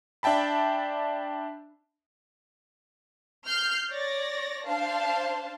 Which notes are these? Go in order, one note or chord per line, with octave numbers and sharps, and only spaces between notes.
D4 E5 G5 A5 B5
F6 G6 C7
C#5 D5 A6 A#6
D4 C5 F5 A5